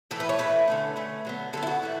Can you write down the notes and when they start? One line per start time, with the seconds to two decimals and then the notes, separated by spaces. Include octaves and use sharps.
0.11 A2 E3 A3 A4
0.20 B4
0.29 C#5
0.39 A2 E3 A3 B4
0.68 D3 A3 C#4
0.96 D3 A3 C#4
1.25 D3 F#3 B3
1.53 D3 F#3 B3 A4
1.63 E4
1.67 F#4
1.82 A2 E3 A3